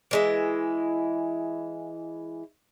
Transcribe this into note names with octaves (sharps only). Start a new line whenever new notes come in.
E3 G#3 E4